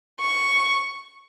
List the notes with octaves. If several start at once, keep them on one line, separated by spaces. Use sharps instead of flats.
C#6